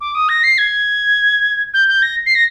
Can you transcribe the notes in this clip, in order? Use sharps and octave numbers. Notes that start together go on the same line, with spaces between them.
D6
D#6
A#6
C7
G#6
G6
G6
A#6
C7
A#6